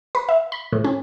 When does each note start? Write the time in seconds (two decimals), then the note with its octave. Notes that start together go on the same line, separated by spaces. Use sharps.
0.15 B4
0.29 E5
0.52 B5
0.73 A2
0.84 C#4